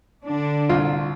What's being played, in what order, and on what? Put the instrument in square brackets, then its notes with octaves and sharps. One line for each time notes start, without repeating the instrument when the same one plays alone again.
[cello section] D3 D4
[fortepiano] C2 F4